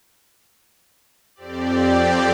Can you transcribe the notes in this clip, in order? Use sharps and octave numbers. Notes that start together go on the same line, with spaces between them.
F2 C4 G4 D5